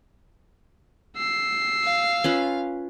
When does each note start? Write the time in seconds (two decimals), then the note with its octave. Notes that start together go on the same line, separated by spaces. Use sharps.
1.17 E6 C7
1.83 F5
2.24 C#4 F4 B4